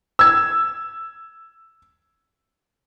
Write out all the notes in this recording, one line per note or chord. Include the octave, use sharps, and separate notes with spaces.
E6 G#6